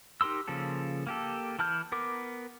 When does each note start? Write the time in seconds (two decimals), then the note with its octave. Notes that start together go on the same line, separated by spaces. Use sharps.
0.21 D#4 G4 A#4 C6 E6
0.48 C#3 F3 A#3 A4
1.07 A#3 G4 A4
1.59 E3 E4 A5 F6 G6
1.92 B3 A#4 D6